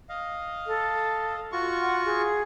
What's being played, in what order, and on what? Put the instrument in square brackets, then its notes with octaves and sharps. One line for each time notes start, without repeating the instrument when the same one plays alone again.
[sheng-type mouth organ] D#5 F5
[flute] A4
[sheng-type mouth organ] F4 F#4 C#6
[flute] F#5
G#4